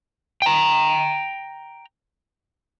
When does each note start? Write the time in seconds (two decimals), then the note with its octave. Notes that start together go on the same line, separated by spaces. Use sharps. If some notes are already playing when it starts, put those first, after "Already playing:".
0.42 G5 A#5